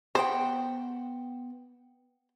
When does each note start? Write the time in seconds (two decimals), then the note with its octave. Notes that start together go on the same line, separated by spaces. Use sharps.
0.15 B3 C5 F#5 G5